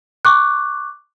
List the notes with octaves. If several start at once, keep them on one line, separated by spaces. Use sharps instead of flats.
C#6 D6 F#6